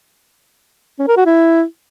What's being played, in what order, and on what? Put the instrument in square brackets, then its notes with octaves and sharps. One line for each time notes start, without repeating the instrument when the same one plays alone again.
[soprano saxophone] C#4
A#4
F#4
E4